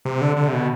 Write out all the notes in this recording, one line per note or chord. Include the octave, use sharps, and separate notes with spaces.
C3
D3
D3
C3
B2